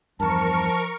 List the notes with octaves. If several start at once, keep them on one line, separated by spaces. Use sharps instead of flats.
E2 G2 F3 A#4 A5 C#6